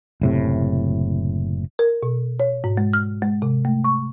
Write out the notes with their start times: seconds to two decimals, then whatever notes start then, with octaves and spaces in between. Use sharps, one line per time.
0.21 F#1 A2 C3
1.79 A#4
2.03 B2
2.40 C#5
2.64 G#2
2.77 G#3
2.93 F6
3.22 G#3
3.42 C3
3.65 A3
3.84 C#6